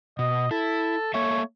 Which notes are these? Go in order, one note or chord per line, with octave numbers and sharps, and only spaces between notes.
B2 D#5
E4 A4
A#3 A4 C#5 E5